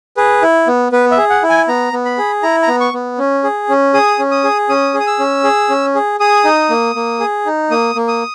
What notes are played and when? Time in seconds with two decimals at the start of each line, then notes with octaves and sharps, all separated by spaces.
0.17 G#4 B4
0.42 E4
0.67 B3
0.92 B3 B4
1.11 E5
1.17 G#4
1.30 F#5
1.43 E4
1.49 G#5
1.68 B3 A#5
1.93 B3
2.05 B5
2.18 G#4
2.43 E4 A#5
2.63 A#5
2.68 B3
2.81 C#6
2.94 B3
3.19 C#4
3.44 G#4
3.69 C#4
3.94 G#4 D#6
4.19 C#4
4.31 D#6
4.44 G#4
4.69 C#4 D#6
4.94 G#4
5.00 D#6
5.07 E6
5.19 C#4
5.44 G#4
5.69 C#4
5.95 G#4
6.20 G#4 D#6
6.44 D#4
6.70 A#3
6.95 A#3
7.20 G#4
7.46 D#4
7.71 A#3 D#6
7.95 A#3
8.08 D#6